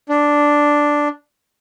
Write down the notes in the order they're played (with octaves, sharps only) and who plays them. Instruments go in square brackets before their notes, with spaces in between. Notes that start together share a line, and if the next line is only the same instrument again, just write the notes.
[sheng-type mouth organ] D4